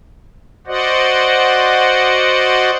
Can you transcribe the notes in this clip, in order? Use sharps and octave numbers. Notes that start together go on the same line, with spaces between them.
F#4 C5 D5 D#5 F#5